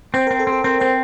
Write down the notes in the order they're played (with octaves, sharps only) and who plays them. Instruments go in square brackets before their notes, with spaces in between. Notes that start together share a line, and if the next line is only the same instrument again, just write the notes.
[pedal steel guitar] C4 [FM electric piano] C5
[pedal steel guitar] C4 [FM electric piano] A#4
[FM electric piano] A4
[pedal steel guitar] C4
[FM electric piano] A4
[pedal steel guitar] C4 [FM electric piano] A#4
[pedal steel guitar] C4 [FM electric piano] C5